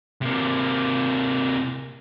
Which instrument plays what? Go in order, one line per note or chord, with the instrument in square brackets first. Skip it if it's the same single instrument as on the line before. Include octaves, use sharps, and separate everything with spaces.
[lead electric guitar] C3 A#3